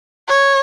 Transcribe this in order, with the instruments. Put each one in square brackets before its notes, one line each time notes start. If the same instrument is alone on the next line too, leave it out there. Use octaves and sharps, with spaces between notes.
[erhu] C#5